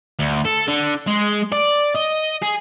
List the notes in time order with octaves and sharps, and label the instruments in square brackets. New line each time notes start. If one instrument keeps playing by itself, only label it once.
[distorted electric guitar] D2
A4
D3
G#3
D5
D#5
G#4